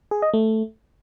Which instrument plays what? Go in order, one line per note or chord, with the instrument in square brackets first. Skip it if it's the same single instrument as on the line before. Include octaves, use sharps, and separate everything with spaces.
[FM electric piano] G#4
D#5
A3